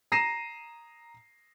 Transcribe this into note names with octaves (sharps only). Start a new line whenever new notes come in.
A#5 A#6 C7 D#7 E7